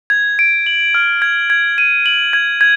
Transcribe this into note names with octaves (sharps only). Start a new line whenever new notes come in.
G#6
D7
F#7
F6
G#6
G#6
D#7
F#7
G#6
G#6